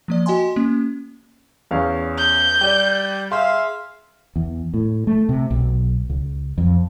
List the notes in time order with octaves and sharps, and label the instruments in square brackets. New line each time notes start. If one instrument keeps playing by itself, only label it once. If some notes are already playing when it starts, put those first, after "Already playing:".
[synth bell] F3 A#3 D5
F#4 D#5 G5 G#5 C6
A#3 C#4
[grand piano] E2 C#4 F5
[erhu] G6
[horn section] G3 [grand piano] G4 D5
[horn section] G#4 E5 F5 [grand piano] C6
[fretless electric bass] E2
A2
A3
C3
B1
C#2
F2